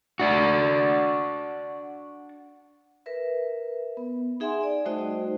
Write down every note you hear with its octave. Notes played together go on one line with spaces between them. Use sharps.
D4 F#4
A#4 B4 E5
B3
D#4 G#4 E5 F#5 G#5 C6
D5
G3 A3 D#4 F#4 C5 D#5